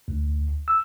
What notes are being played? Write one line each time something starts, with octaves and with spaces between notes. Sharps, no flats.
D2
E6